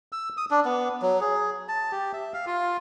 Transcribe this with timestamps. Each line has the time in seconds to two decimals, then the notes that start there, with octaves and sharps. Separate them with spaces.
0.12 E6
0.37 D#6
0.51 D4
0.65 B3
1.02 F#3
1.21 G#4
1.69 A5
1.92 G4
2.13 E5
2.34 F5
2.47 F4